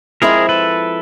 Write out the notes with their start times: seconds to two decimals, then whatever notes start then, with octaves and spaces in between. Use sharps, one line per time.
0.22 F3 G#3 C4 E4 G#4 A#4
0.49 A4 B4